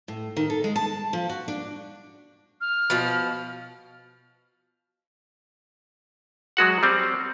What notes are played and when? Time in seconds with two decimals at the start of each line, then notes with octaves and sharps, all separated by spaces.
0.08 A2
0.37 D#3
0.50 A4
0.64 G#3
0.76 A5
1.13 F3
1.30 F#4
1.48 D4
2.61 F6
2.90 B2 F3
6.57 F#3 G#3 F#4 F#5
6.83 G3 C4